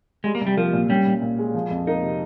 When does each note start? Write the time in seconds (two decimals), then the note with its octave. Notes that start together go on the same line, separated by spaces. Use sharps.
0.24 G3 G#3
0.35 A#3
0.41 C2
0.47 G3
0.57 F3 A#3
0.73 A#2
0.89 G3 C#4
1.06 A#2
1.22 A#2
1.39 G#3
1.54 F3
1.70 F2
1.87 A#3 D#4
2.03 C3